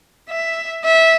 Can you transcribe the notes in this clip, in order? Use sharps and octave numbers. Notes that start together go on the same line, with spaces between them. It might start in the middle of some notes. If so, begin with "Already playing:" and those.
E5
E5